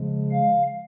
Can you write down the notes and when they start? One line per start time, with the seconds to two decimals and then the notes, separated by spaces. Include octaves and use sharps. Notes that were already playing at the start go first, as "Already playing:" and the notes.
Already playing: C#3 F3 G#3
0.32 F5